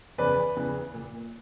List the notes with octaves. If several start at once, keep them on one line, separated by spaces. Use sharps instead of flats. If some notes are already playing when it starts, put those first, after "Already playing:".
E2 C#3 E3 B4 D5
E2 C#3 E3
A#2